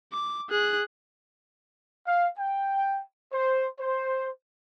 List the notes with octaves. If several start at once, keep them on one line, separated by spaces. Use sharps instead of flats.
D6
G#4 F#6
F5
G5
C5
C5